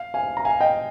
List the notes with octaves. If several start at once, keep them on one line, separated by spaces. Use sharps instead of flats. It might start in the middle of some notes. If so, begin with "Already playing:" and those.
Already playing: F5
F5 G#5
A#5
F5 G#5
D#5 G5